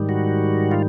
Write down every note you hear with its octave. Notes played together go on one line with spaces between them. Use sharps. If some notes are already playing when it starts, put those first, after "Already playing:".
Already playing: G#2 D#3 G3
F#4
F4